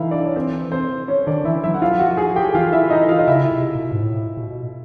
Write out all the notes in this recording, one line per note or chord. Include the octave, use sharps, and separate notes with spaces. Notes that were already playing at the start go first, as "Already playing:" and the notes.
Already playing: E3 D#4 E4 E5 F5
D4 D5
C#5
C4 C5
C4 C5
C#4 C#5
D#3 D4 D5
E3 E4 E5
F#3 E4 E5
F#5
F3 F4 F5
F#4 F#5
G#4 G#5
G4 G5
E3 F4 F5
E4 E5
D#4 D#5
F4 F5
D#5
C#3 E4 E5
C3
B2
G#2
A2
B2